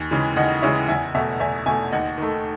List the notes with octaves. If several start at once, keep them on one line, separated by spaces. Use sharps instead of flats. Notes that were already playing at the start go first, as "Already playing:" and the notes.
Already playing: D#2 G#5
C#3 E3 G#3
D#2 D#5 F#5
C#3 E3 G#3 C#5 E5
E2 E5 G#5
B2 A3 E5 G#5
E2 E5 G#5
B2 A3 E5 G#5
D#2 D#5 F#5
D#3 A3